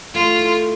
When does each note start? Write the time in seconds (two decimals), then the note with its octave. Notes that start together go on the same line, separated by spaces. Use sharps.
0.14 A3 F4
0.39 E4